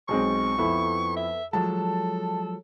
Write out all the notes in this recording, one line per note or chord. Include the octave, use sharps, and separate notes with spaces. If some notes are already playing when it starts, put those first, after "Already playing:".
B1 G#3 C4 C#6
F2 B3 E4 A4
E5
F3 F#3 G#3 A4 A5